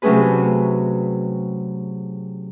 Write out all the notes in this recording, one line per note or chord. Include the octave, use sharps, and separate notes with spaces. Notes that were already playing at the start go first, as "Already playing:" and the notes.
C3 F#3 A3 C#4 G#4 B4